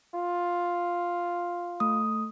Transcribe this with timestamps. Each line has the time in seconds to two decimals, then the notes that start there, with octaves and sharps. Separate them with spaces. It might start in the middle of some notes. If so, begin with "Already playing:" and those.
0.15 F4
1.80 A3 D#6